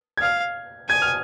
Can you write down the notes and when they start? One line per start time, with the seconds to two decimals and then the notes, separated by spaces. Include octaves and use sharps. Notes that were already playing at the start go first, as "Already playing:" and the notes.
0.17 G#6
0.22 F5 F6
0.89 G#5 G#6
1.02 F6